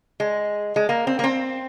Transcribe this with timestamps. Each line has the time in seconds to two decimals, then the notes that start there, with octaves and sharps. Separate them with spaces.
0.20 G#3
0.76 G#3
0.89 A#3
1.07 C4
1.19 A#3
1.24 C4